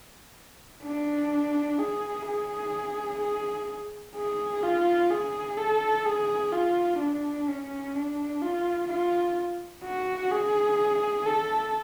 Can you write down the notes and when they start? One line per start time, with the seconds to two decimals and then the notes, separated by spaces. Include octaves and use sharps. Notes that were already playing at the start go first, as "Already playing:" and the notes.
0.83 D4
1.78 G#4
2.26 G#4
3.21 G#4
4.15 G#4
4.63 F4
5.11 G#4
5.57 A4
6.05 G#4
6.52 F4
6.99 D4
7.48 C#4
7.94 D4
8.42 F4
8.89 F4
9.84 F#4
10.31 G#4
11.26 A4